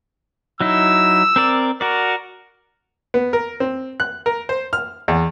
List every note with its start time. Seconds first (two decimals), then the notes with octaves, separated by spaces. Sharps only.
0.61 F#3 D#4 E4 E6
1.36 C4 A#4 D5
1.81 F#4 A#4 D5
3.14 B3
3.33 A#4
3.60 C4
4.00 F#6
4.26 A#4
4.49 C5
4.73 F6
5.08 E2